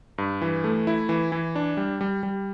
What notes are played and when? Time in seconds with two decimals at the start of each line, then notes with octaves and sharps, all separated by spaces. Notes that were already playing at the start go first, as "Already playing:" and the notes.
0.18 G2
0.41 E3
0.64 A3
0.87 E4
1.09 E3
1.32 E3
1.55 D4
1.77 G3
2.01 G3
2.23 G3